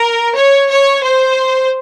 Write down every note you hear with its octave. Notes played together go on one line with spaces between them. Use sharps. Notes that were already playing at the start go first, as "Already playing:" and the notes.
Already playing: A#4
C#5
C#5
C5